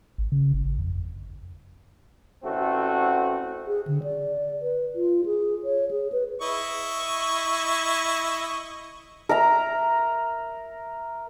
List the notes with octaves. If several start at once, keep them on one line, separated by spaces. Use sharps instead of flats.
G#1
C#3
G1
G#1
F2
A1 A3 C4 F#4
G#4
D3
D5
B4
F4
G#4
C#5
G#4
B4
E4 D#5 C#6
A#4 E5 A#5